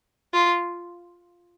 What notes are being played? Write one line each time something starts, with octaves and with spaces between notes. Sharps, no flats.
F4